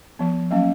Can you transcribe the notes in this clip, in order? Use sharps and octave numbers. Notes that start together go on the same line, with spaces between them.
F3 B3
F#3 A#3 C#4 F5